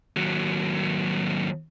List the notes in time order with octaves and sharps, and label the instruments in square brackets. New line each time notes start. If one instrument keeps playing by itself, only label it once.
[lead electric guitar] D#2 F#3